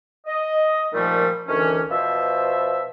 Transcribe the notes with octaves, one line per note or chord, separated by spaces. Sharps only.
D#5
A#2 D#3 F3 G3 A3
D2 D#3 E3 C#4
B2 F3 C5 E5